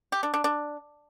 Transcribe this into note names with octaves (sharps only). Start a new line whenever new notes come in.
G4
D4
D4
D4